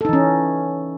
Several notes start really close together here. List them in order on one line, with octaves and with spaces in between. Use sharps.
A4 D#4 E3 C#4